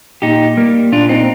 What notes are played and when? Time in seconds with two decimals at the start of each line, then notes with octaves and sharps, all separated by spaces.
0.22 A#2 D#4 G4
0.57 G3 A#3
0.92 A#2 D4 F4
1.09 C4 D#4